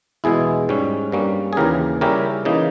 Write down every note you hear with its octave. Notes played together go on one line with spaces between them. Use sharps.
E2 B2 G#3 E4 G#4
G#2 G3 C#4
G2 G3 A#3 C#4
G#4
D#2 C#3 E3 G4 A#4
C#3 G3 C#4 E4 G4 A#4
C#3 E3 A#3 D#4